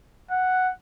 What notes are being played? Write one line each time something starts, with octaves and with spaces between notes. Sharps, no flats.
F#5